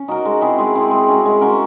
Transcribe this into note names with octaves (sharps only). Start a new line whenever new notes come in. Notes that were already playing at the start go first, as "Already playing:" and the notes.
Already playing: C#4
D#4 F#4 A#4
G#3
C4 E4 G#4
G#3
C4 E4 G#4
G#3
C#4 F#4 A#4
G#3
C#4 F#4 A#4